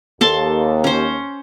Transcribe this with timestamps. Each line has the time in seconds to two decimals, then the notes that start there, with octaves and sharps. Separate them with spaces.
0.21 D#2 A4 A5 C6
0.84 C#4 C5